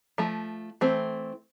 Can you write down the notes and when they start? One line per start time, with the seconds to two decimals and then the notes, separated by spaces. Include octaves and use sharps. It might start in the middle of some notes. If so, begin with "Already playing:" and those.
0.18 F3 A3
0.81 E3 A3 C4